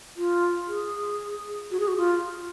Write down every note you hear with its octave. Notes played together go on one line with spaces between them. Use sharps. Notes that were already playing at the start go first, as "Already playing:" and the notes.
F4
G#4
F#4
G#4
F#4
F4